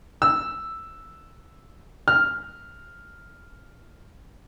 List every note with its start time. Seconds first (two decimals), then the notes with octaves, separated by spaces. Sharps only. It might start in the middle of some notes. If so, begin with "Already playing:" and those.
0.22 E6
2.08 F6